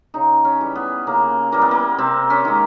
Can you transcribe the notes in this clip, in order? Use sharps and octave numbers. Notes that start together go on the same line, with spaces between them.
C#3 D#4
C#4
E3 G3
B3
C#3 A#3
E3 G3 A#3
B3
A#3
C3 C4
C#4
D#3 G#3